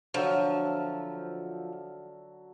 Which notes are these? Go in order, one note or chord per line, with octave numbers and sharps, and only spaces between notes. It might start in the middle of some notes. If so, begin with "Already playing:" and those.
D3 F3 F#3 E5